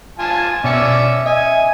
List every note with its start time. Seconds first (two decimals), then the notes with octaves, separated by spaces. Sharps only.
0.19 F4 G#5 A5
0.64 B2 C#4 D5 E5 C#7
1.26 D#5 E5 G#5